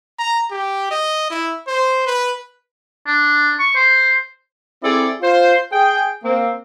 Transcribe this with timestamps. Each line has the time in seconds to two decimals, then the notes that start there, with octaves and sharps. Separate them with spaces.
0.19 A#5
0.51 G4
0.91 D#5
1.30 E4
1.67 C5
2.06 B4
3.06 D4
3.59 C#6
3.76 C5
4.83 C4 E4 G#4 A4 D5
5.22 F4 C5
5.72 G#4 G5
6.23 A#3 C4